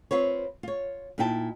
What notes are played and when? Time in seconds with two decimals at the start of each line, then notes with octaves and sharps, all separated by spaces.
0.11 C4 F4 B4 C#5
0.63 F4 C#5
1.18 A#2 D#4 E4 G5 A5